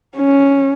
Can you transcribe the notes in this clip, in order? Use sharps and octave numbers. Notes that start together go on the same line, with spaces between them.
C#4